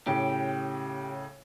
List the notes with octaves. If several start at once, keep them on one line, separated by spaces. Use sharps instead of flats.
A2 C#3 G4